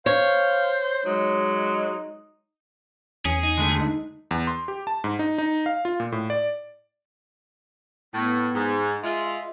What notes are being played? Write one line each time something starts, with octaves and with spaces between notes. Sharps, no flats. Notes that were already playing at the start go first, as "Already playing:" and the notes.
C5 C#5 F5
F#3 G#3 D#4
E2 C#4 G#4
D#4
D3 G#3 A3
D#4
E2
C6
G4
A5
G#2
D#4
D#4
F5
F4
A#2
A2
D5
A2 B3
G#2
G#3 F4 E5